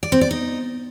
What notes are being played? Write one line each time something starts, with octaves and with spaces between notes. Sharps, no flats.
D5
C4
D5
D#4